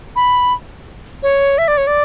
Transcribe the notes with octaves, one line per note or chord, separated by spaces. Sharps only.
B5
C#5
E5
D5
C#5
D5